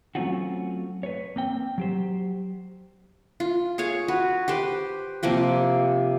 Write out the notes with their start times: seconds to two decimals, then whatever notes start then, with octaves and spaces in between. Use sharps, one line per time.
0.15 F#3 A3 C4 C#4 F4 F#4
1.03 B4 C#5
1.36 A#3 C4 G5
1.78 F#3 G4 C5
3.40 F4
3.78 G#4 C#5 F5 G#5
4.08 F#4 B4
4.48 G4 B4 C5
5.23 C3 F3 A#3 G4